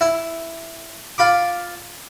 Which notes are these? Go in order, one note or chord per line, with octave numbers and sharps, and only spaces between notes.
E4
F4 B5 D6